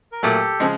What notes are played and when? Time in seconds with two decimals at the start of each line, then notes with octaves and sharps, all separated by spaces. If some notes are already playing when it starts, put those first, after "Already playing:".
0.12 A#4
0.23 A#2 F#3 A3 G4 A4
0.60 C#3 F3 G#3